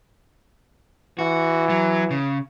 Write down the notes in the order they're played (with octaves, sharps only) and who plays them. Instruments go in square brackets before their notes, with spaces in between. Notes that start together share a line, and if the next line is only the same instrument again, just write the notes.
[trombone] E3 [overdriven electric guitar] F#4
[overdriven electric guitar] F#3
C#3